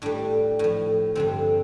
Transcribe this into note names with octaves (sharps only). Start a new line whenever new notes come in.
A2 G3 D4
A2 F3
G2 D3 F3 C4